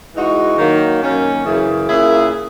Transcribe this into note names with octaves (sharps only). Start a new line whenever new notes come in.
E3 G#3 D#4 F#4
D#3 F#3 A#3
F#2 D#3 A#3 C#4
F#2 C#3 E3
A#2 A#3 C#4 E4 G#4